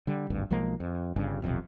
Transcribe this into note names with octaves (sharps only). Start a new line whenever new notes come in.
D3 G3
G#1 D2 G2
B1 F3 G#3 A#3
F2
G1 G2 C#3
D#1 B1 F2 C3